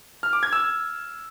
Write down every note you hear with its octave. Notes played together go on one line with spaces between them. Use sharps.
F6
D6
G#6
E6